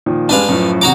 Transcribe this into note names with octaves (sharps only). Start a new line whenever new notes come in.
A#2 D#3 F3
G2 G3 G#3 D4 B4 F5
F#2 A2 F3
E2 C3 F#4 A#5 D6